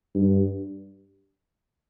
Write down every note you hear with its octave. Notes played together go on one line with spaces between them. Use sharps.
G2